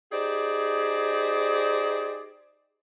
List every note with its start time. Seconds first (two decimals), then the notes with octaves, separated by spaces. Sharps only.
0.12 D#4 G4 G#4 C5 D5